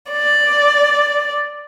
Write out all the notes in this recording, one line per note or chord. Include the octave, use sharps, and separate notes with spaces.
D5